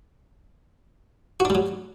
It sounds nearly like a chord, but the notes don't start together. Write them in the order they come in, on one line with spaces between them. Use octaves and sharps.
F#4 D4 G3 F#3